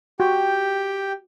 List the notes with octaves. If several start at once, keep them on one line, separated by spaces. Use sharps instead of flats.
F#4 G4 G5